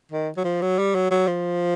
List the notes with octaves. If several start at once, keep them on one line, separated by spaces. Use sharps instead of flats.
D#3
F#3
F3
F#3
G3
F#3
F#3
F3